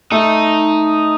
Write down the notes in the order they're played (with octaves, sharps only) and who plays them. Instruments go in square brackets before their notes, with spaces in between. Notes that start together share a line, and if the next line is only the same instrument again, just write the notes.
[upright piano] A3 [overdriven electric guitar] D#4